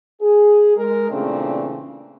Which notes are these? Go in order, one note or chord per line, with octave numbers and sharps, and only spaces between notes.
G#4
G#3 A#4
A#2 C#3 E3 A3 C4 D4